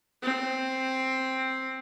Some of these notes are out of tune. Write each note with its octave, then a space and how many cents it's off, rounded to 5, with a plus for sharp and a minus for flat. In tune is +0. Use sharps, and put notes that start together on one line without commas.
C4 +5